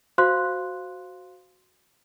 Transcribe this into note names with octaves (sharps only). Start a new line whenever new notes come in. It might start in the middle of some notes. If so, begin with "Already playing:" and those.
F#4 C5 F5 C6 F#6